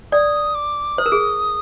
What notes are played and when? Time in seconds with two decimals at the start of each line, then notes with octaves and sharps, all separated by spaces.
0.12 D5 D#6
0.55 D6
0.98 C5 D#6
1.06 A#4
1.12 G#4